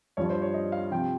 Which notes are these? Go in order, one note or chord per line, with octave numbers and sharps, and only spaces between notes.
G2 F3 C#5
C5
C#5
D#5
F5
C3 F3 G5